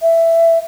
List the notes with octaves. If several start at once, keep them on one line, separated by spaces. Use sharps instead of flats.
E5